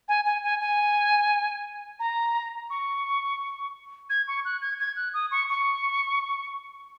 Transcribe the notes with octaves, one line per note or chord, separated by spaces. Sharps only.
G#5
G#5
G#5
G#5
A#5
C#6
G#6
C#6
F#6
G#6
G#6
F#6
D#6
C#6
C#6